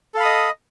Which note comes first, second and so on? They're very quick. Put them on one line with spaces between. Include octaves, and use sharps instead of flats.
A4 F5 B5 D#6 D#5